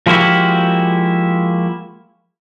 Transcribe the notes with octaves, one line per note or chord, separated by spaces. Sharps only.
F3 G#3 A#3 E4 F#4 G4